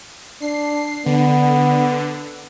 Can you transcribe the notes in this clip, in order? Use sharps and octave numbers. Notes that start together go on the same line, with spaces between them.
D4 C7
D3 B3